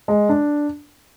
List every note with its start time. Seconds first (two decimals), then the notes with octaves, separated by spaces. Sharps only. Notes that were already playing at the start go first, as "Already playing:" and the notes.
0.08 G#3
0.29 D4